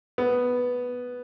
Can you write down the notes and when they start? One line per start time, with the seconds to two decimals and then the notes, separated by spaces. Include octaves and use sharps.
0.18 B3